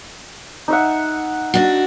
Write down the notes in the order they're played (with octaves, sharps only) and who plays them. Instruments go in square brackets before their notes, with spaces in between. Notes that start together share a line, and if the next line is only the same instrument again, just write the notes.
[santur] D#4 E5 F#5
[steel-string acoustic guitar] D4 F#4